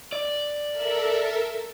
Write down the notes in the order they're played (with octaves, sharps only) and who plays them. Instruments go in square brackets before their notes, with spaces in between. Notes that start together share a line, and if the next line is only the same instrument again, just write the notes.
[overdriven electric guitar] D5
[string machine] A4 A#4 E5